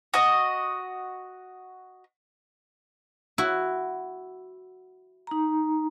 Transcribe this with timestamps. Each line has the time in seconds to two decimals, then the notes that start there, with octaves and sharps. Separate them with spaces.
0.14 F#4 D#5
3.38 E4 F#4
5.27 D#4 A#5